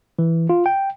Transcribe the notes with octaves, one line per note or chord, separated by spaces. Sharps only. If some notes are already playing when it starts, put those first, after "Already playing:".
E3
F4
G5